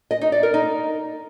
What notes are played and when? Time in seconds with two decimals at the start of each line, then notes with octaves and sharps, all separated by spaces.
0.11 D#5
0.21 D#4
0.32 D5
0.43 A#4
0.54 D#4